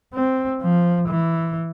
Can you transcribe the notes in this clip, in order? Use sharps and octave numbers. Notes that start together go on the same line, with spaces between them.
C4
F3
E3